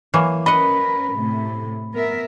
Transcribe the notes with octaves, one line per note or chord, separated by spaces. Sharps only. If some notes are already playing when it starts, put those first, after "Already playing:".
E3 F#3 A#3
C#4 A#4 B4 D#5 F#5 B5
A2 C3 A3
B3 A#4 E5